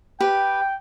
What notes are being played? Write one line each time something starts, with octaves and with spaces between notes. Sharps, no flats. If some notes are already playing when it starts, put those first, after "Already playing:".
G4 B4 G5